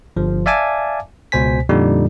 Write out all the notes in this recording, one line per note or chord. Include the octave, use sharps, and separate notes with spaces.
G1 F3
D5 E5 F5 G#5 A5 D6
C#2 B2 C5 G#5 B6
F2 A#2 D3 G3 D#4